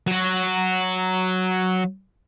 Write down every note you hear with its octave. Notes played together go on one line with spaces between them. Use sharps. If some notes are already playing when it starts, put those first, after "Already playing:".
F#3 F#4